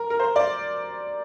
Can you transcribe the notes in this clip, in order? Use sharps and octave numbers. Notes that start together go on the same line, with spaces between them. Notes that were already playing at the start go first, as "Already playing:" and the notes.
Already playing: A#4
A#4
C5
D5